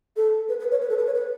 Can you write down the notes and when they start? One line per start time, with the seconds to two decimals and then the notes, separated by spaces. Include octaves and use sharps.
0.17 A4
0.49 B4
0.59 B4
0.71 C#5
0.81 B4
0.89 A4
0.98 B4
1.06 C#5
1.14 B4